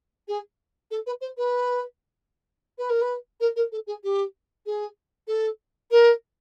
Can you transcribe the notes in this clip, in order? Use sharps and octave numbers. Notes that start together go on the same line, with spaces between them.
G#4
A4
B4
C5
B4
B4
A#4
B4
A#4
A#4
A4
G#4
G4
G#4
A4
A#4